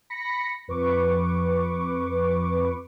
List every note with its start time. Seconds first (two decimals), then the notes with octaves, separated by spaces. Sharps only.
0.10 B5 A#6 B6 C#7
0.68 F2 B4 C#6 D6